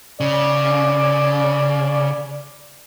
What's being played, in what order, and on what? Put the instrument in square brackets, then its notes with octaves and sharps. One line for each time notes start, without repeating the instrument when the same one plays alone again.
[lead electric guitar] C#3 [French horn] D5